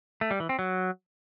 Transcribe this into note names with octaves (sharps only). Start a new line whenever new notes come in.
A3
G3
E3
C4
F#3